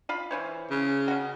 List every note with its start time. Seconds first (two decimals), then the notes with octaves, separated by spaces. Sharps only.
0.09 F4 F5 B5
0.31 E3 C5 C#5
0.70 C#3
1.08 C#4 F#4